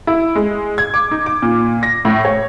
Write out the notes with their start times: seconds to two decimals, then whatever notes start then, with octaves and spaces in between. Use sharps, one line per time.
0.07 E4
0.35 G#3
0.78 G#6
0.94 D6
1.11 D#4
1.26 D6
1.42 A#2
1.83 A#6
2.05 A2
2.25 C#5